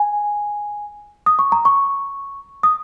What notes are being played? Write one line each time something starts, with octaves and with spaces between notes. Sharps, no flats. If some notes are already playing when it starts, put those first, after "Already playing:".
Already playing: G#5
D#6
C#6
A#5
C#6
D#6